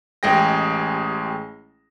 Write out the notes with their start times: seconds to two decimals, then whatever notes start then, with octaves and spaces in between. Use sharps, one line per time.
0.23 A1 G#3 G#4 G5 A#6